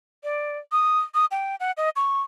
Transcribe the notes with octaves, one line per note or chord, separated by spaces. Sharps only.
D5
D#6
D#6
G5
F#5
D#5
C#6